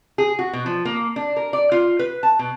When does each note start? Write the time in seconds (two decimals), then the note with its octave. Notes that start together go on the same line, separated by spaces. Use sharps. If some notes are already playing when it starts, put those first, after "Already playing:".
0.18 G#4
0.39 F#4
0.53 B2
0.66 F3
0.85 A#3
1.16 D4
1.36 A#4
1.53 D5
1.72 F4
1.99 B4
2.23 A5
2.39 B2